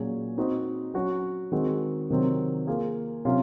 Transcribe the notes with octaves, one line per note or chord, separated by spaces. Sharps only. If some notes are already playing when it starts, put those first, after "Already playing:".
Already playing: A#2 F#3 C#4 G#4 C#5
C4 D#4 F#4 C5 D#5
F#3 C#4 F#4 C#5
D#3 G#3 C4 F#4
C3 D#3 F#3 C4
A#3 F4 G#4
C3 F#3 C#4 F4